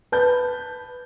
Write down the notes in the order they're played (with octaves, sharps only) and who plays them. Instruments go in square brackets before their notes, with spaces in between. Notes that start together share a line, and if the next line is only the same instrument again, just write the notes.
[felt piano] B4 A5 G6